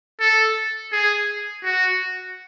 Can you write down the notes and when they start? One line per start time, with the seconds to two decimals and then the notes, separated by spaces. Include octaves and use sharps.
0.20 A4
0.92 G#4
1.64 F#4